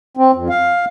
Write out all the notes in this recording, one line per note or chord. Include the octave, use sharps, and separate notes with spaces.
C4
F2
F5